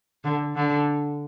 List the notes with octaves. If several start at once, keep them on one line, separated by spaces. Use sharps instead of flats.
D3
D3